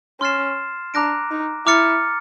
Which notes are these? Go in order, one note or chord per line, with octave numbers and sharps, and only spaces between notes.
C#4 C6 F6 A6 C7 E7
D4 A#5 D6 F#6 A#6 D7
D#4
E4 A#5 D6 F6 A6 C#7